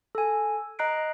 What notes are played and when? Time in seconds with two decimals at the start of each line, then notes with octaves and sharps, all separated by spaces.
0.15 A4 G#5
0.79 D#5 A#5 F#6 C7 D7